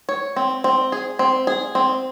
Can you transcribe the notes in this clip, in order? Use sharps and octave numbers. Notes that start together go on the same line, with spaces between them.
C#5
C4
C4
G#4
C4
G#4
C4